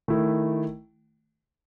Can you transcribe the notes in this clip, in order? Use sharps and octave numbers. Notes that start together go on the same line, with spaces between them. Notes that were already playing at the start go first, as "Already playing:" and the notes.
D#3 A3 E4